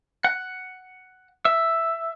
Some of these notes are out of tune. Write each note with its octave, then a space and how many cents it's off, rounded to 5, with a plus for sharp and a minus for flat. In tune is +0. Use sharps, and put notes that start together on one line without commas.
F#5 +5
E5 +5